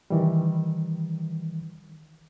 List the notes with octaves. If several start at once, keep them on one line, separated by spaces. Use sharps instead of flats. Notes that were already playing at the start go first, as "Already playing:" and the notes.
D#3 E3 G3